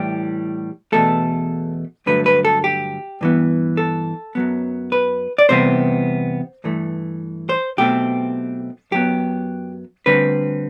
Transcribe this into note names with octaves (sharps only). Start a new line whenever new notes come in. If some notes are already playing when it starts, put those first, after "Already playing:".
Already playing: A2 E3 G3 G4
E2 B2 A3 A4
G2 D3 F#3 A3 B4
B4
A4
G4
G2 E3 B3
A4
F#2 F#3 B3
B4
D5
E2 C3 G3 B3 C5
G2 E3 A3
C5
B1 B2 A3 C4 G4
F#2 F#3 B3 G4
D2 D3 G3 C4 B4